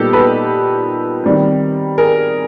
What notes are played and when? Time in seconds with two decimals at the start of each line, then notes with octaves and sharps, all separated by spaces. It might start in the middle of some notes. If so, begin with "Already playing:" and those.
Already playing: A#2 G3 B3 D#4 G4 A4
0.13 A4 B4
1.24 D#3 G3 C4
1.98 G#4 A#4